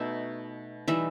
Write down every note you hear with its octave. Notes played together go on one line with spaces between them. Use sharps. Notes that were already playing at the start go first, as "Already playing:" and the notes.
Already playing: B2 A3 D#4 E5
E3 G3 D#4 E5